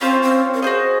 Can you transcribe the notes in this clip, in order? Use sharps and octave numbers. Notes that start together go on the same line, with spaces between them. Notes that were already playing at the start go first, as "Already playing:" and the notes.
C4 C#4 F4 C5
C4
A#4
F#4 G#4 C5 D#5